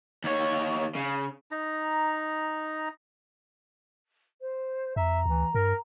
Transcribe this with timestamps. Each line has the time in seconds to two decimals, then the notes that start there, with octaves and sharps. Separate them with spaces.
0.24 D#2 C#5
0.95 C#3
1.51 D#4 A#5
4.41 C5
4.96 F2 E5 A#5
5.26 D2 E3
5.55 G2 A#4